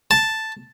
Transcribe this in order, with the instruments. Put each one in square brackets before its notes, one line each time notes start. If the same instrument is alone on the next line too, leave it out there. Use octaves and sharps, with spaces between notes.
[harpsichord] A5